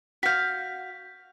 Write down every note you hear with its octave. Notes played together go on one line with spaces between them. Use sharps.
F#4 F5 G6 B6